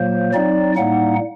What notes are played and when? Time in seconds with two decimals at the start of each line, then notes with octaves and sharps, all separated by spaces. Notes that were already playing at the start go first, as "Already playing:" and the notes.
Already playing: A#2 F#3 A#3 C5
0.33 F#3 C4 D#4 D5
0.76 A2 G3 A#3 D#4 F#5